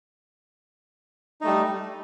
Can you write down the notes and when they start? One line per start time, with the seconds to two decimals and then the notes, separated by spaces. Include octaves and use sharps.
1.41 D#4
1.44 A3
1.47 G3